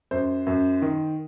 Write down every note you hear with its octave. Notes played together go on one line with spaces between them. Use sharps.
F#2 C5
F#2
D#3